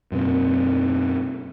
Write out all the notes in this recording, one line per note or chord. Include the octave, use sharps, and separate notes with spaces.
F#2 B2 C4